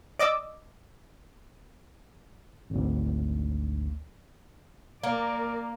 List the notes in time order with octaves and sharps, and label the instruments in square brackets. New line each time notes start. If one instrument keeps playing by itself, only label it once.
[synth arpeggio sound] D5 D#5 D6 E6
[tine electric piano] G#1 D2
[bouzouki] A#3 [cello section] A#4 D5